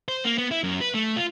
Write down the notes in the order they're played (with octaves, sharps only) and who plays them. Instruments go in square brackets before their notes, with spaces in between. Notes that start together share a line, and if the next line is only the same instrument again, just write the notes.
[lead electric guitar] C5
A#3
B3
E4
F#2
B4
A3
F4